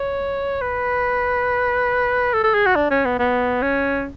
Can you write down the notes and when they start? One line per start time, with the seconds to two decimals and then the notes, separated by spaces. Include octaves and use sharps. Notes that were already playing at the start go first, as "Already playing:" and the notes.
Already playing: C#5
0.61 B4
2.34 A4
2.44 A4
2.54 G#4
2.66 F#4
2.76 D4
2.91 C#4
3.05 B3
3.19 B3
3.62 C#4